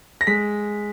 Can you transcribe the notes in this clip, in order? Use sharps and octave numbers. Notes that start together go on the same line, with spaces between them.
A#6
G#3 B6